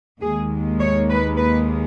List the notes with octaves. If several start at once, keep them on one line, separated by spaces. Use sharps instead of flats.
D#2 D#3 G#3 G#4
C#5
B4
B4